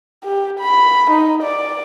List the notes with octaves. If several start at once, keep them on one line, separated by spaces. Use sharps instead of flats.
G4
B5
D#4
D5